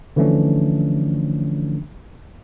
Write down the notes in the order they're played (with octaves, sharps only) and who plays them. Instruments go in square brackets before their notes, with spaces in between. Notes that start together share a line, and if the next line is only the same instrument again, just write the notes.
[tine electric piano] D3 E3 F3 A3 C#4 D4